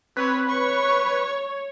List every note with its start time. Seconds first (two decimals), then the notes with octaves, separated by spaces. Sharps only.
0.17 C4 B4 C#5
0.48 C#5 C#6